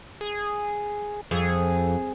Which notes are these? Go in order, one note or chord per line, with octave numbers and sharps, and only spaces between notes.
G#4
F2 G#4